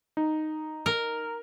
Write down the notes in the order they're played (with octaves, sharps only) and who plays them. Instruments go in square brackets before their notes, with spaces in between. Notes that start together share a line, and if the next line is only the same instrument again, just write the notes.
[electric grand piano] D#4
[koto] A#4